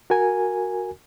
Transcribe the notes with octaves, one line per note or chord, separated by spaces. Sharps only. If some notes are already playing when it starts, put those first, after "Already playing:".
F#4 A#4 G#5